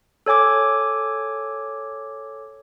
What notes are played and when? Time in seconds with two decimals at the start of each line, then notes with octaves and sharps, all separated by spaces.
0.26 A4 C#5 G#5 D6 G#6